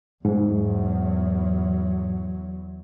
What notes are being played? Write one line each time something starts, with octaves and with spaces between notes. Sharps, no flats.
E2 G#2 F#3